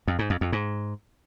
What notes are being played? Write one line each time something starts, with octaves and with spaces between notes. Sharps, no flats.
F2
G#2
F2
F2
G#2